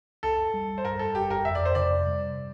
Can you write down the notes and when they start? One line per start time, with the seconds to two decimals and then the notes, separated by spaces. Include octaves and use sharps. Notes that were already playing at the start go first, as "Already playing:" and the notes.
0.23 C2 A4
0.54 G3
0.78 C5
0.84 G2 A#4
0.99 A4
1.14 G1 G4
1.30 A#4
1.45 F2 E5
1.55 D5
1.65 C5
1.75 C3 D5
2.06 G3